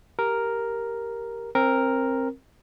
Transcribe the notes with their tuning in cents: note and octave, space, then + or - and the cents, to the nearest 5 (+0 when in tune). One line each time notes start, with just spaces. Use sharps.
G4 +5 A#4 +0
C4 +20 A#4 +0